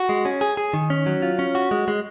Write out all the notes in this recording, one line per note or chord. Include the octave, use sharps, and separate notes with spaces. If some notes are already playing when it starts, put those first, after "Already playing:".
Already playing: F#4
G#3
C#4
G#4
G#4
D#3
C#4
F#3
F4
C#4
F#4
G#3
G#3